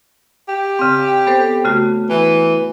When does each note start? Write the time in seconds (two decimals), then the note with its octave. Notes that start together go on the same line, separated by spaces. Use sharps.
0.48 G4
0.79 C#3 C4
1.27 B3 A4 C5
1.64 C#3 A3 F#4
2.10 E3